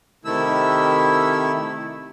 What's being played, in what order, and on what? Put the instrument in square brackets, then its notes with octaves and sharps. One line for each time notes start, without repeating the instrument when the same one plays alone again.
[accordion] C3 D#3 A3 E4 E6